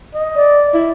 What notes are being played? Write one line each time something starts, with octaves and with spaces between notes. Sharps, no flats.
D#5
D5
E4